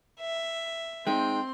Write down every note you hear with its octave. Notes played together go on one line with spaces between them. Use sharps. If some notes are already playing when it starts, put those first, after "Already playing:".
E5
G#3 C4 D#4 G5 C6